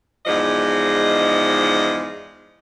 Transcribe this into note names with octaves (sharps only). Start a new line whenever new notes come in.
E2 G#2 F3 G#3 D5 D#5